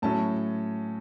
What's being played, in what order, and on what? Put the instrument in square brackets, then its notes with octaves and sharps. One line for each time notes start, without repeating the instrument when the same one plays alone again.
[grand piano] A2 F#3 C#4 A5